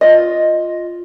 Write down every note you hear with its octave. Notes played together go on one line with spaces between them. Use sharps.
F4 D#5